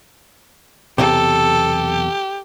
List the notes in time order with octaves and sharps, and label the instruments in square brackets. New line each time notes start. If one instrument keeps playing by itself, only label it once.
[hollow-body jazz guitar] B1 E2 C3 [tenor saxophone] G4 [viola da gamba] A4